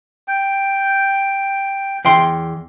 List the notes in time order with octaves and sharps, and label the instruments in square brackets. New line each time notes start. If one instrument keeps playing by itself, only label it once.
[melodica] G5
[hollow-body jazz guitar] E2 G5 C6